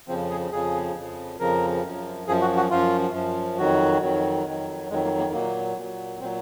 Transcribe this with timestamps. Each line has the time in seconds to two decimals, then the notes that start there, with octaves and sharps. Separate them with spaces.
0.08 F2 C#3 F3 C4
0.30 G#4
0.51 F2 C#3 F3 G#4
0.95 F2 C#3 F3
1.40 F2 C#3 F3 A#4
1.83 F#2 F3
2.27 F#2 F3 G#4
2.42 F#4
2.57 F#4
2.71 F#2 F3 F4
3.14 F#2 F3
3.58 F2 D#3 F#3 F#4
4.02 F2 D#3 F#3
4.46 F2 D#3 F#3
4.90 F2 D#3 F#3 G#3
5.04 A#3
5.18 A#3
5.33 A#2 F#3 A#3
5.77 A#2 F#3
6.21 A#2 F#3 C4